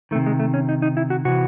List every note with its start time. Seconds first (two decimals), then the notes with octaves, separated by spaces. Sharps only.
0.11 D#3 A3
0.15 C3
0.26 G#3
0.40 A3
0.54 C#4
0.69 D#4
0.82 D#4
0.97 E4
1.10 F#4
1.25 C3 E3 F#4